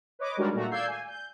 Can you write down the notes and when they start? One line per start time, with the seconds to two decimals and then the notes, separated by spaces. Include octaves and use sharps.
0.19 B4 C#5 D#5 D6
0.37 D#3 G3 G#3 D4 F#4 A#4
0.54 A#2 A3 F#4 A#5
0.71 D5 F5 E6 G6 G#6 C7
0.88 G#5
1.08 G6